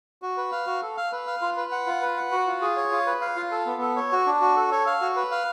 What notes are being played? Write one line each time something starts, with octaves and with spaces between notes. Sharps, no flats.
F#4
B4
F5
F#4
A4
F5
B4
F5
F4
B4
F#5
F4
B4
F#5
F#4
F4
G#4
C#5
F4
B4
F5
F4
A4
B3
A4
C#5
F#4
D4
F#4
A4
C#5
F5
F#4
B4
F5